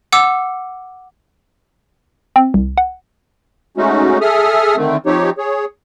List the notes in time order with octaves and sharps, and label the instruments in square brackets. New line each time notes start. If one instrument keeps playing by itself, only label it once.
[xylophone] F#5 D6 E6
[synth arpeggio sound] C4
C2
F#5
[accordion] G#3 A3 C#4 D#4 F#4
G#4 A4 E5 D#6 F6
D3 D#3 A3 C4
F3 C4 D#4 G4 C#5
G#4 C#5